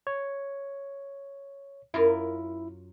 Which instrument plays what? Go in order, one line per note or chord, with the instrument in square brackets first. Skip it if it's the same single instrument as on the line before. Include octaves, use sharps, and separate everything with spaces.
[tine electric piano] C#5
[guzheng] F#2 F4 A#4 [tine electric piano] E4